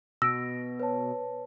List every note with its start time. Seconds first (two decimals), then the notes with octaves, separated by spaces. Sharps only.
0.22 B2 E6 A#6 D7
0.80 B4 C#5 A5